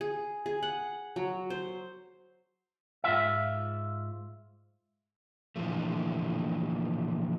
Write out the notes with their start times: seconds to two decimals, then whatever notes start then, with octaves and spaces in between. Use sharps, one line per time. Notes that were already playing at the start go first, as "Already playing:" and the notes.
0.01 G#4
0.46 G#4
0.63 F#5
1.16 F#3
1.50 C5
3.04 G#2 F4 E5
5.56 A#2 D3 E3 F3 A3